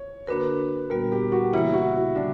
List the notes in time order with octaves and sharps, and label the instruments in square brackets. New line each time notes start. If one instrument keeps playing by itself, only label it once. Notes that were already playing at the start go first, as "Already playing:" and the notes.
Already playing: [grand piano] C#5
[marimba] D3 A#3 D4 F#4 A#4 [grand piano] B4
[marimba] A#2 G3 B3 F#4 [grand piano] A#4
[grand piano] G4
F#4
[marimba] C#3 E3 A#3 [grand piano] E4
[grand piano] F#4
E4
[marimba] D3 G3 [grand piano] D4